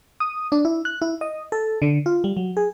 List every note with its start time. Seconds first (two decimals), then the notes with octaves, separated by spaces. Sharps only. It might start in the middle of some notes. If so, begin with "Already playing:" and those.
0.20 D#6
0.52 D4
0.65 E4
0.85 F#6
1.02 E4
1.21 D#5
1.52 A4
1.82 D3
2.06 F4
2.24 G3
2.37 F#3
2.57 G#4